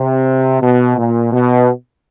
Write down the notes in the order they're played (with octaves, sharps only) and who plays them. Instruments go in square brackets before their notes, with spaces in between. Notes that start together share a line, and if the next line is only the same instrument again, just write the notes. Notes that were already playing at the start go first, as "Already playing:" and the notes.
Already playing: [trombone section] C3
B2
A#2
B2